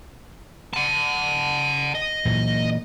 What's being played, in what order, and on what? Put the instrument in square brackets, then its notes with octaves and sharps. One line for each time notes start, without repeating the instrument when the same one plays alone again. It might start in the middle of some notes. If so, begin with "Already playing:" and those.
[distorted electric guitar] F#5 A5
D#5
[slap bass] A#2 E3 F#3